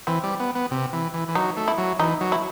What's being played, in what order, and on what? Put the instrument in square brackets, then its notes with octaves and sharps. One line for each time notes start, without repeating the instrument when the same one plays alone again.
[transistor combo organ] E3 [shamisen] C4
[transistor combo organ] G3
B3
B3
C3
E3
E3
E3
[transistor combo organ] F#3 [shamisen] D#4
[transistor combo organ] A3
[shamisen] E4
[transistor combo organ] F#3
[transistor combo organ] E3 [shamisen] D#4
[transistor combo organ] F#3
[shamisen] E4